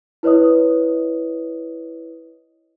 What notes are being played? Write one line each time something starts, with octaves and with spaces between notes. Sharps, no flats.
E4 B4 C#5 D#5 D#6